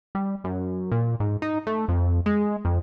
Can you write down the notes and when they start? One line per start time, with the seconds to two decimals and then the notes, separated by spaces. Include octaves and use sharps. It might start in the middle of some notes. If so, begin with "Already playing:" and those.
0.15 G3
0.44 F#2
0.92 A#2
1.20 G#2
1.42 D#4
1.67 A3
1.88 F2
2.26 G#3
2.65 F2